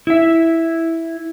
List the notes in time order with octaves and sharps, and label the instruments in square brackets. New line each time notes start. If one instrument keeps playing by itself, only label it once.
[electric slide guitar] E4 E5